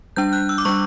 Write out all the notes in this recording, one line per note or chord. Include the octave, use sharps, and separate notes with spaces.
G3 D4 G6
F#6
E6
D6
G3 D4 C#6